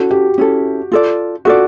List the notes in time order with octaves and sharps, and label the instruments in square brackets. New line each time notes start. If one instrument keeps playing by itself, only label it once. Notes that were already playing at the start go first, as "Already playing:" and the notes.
Already playing: [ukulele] C#4 E4 A4 [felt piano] F#4
[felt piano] G4
[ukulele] C#4 E4 A4
F4 A4 D5
[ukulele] F4 A4 D5 [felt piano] F#4